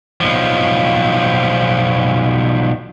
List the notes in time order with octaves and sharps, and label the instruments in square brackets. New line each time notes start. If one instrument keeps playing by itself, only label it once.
[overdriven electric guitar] B1 F3